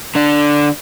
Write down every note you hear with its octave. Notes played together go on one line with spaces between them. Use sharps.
D3 D4